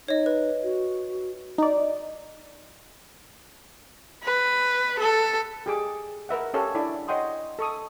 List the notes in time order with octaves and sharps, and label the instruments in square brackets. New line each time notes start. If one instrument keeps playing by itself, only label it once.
[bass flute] D#4 [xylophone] C#5 D#5
[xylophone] B4
[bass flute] F#4
[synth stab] D#4 D5
[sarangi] B4
A4
[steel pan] G4 G#4 D6
A#4 B4 E5 F#5
C#4 G4 A4 C#5 F5
D4 E4 A4 D5
C#5 D#5 F#5 G5 C6 D#6
A4 C#6 D#6